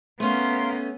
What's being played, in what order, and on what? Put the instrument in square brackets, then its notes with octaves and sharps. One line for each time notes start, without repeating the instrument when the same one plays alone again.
[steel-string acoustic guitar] A3 C#4 [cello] B3 [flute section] A#4 F5 C6